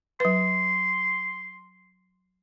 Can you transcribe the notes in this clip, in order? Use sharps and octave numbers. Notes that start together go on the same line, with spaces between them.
F#3 B4 C6